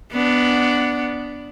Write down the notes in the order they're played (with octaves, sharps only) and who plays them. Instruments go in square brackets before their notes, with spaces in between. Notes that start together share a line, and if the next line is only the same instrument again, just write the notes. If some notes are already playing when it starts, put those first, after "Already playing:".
[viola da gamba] B3 D4